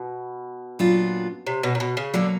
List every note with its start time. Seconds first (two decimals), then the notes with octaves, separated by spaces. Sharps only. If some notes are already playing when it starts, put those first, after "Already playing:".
Already playing: B2
0.79 A#2 F#3 B3 D4 F4
1.47 C3
1.63 B2
1.75 A#2
1.80 B2
1.97 C#3
2.14 B2 D3 F#3 A#3